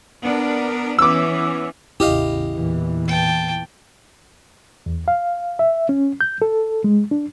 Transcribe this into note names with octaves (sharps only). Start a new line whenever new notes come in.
B3 D4 A#4
E3 B3 C#4 D6 E6
A1 E2 C#3 E4 G4 D#5 F5
E2 A#2 E3
G5 A5
E2
F5
E5
C#4
G6
A4
G#3
D4